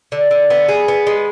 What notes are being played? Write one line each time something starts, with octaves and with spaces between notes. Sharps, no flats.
D3
D3
B3
G#4
B3
G#3